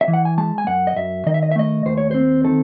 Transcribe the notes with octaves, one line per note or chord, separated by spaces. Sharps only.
E5
E3
F#5
G#5
G#3 A5
G#5
F#2 F#5
D#5
F#2 E5
D#3 D#5
E5
D#5
E5
A3 D#5
D#2 C5
C#5
C4 C5
D#3 A4